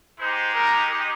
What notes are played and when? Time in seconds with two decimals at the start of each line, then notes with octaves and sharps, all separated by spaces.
0.19 G#3 D#4 G4 C5
0.53 A#4